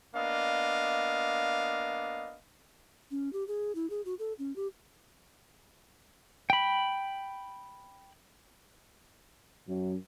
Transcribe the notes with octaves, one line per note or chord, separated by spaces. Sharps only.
A#3 B3 D4 D#5 F5
C#4
G4
G#4
E4
G#4
F#4
A4
C#4
G4
G5 B5
F#2